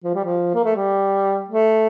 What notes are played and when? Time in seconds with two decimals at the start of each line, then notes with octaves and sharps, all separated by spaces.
0.04 F3
0.15 G3
0.25 F3
0.54 A#3
0.64 A3
0.76 G3
1.48 A3